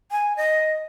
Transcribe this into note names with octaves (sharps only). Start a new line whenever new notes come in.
G#5
D#5